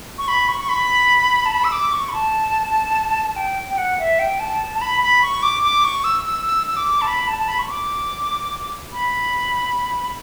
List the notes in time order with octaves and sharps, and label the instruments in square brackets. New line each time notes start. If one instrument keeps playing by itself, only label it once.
[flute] C#6
B5
C#6
C#6
B5
A5
B5
E6
D6
C#6
B5
A5
A5
G5
G5
F#5
E5
G5
A5
A5
B5
B5
C#6
D6
D6
C#6
E6
E6
E6
E6
D6
A5
B5
A5
A5
B5
C#6
D6
B5